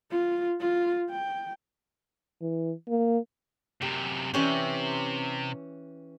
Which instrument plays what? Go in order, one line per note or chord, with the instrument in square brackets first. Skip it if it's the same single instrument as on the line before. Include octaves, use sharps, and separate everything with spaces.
[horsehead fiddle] F4
F4
G5
[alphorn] E3
A#3
[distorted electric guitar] F#2 C3 [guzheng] G4
[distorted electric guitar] C3 [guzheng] E3 C#4 G4